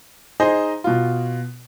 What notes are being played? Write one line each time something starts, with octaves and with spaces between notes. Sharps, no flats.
D#4 G#4 C5 D#5
B2 F4